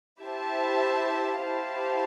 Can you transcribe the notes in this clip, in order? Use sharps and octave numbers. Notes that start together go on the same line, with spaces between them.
E4 G4 C5 E5 A5
E4 G4 C5 F5 A5